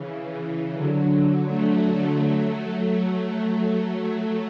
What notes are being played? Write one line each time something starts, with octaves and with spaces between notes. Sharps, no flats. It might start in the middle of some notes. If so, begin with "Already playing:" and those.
Already playing: C#3 E3
D3 F#3
D3 F#3
F#3 A3
F#3 A3
F#3 A3